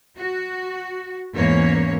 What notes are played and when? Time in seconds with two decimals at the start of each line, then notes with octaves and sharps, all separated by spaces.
0.18 F#4
1.33 E2 G#2 E3 A#3 C#4 C#5